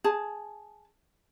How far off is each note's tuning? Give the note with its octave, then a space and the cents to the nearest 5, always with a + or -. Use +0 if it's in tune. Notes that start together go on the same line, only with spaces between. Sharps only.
G#4 +0 A5 -10